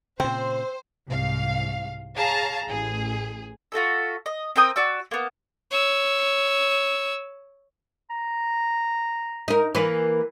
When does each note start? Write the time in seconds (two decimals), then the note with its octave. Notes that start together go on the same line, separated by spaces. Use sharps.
0.20 A#2 C#3 C4 C5
1.07 C2 G#2 F5
2.17 G#4 C#5 F5 A5 A#5
2.67 A1 G#4
3.72 F4 F#4 A4 E5
4.26 D#5
4.56 C4 A#4 G5 D#6
4.76 F#4 D5 E6
5.11 A#3 B3
5.71 C#5 E6
8.10 A#5
9.48 D#4 A#4
9.75 E3 A#3 B4